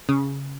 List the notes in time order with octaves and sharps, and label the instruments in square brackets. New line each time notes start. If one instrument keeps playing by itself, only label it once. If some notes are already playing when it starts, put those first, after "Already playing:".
[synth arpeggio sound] C#3